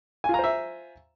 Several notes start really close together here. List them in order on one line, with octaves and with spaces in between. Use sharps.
G#5 F4 A#5 C5 E5